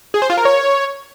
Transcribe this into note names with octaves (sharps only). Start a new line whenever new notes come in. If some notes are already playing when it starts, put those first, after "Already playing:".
G#4
C5
F4
A#4
C#5